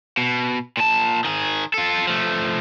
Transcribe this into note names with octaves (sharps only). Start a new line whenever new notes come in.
B2
A#2 A5
D#3 G#4
F4 A4
F3 A3